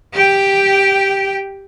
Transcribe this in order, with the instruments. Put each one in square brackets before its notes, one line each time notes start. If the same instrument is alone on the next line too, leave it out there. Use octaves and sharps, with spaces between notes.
[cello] G4 G5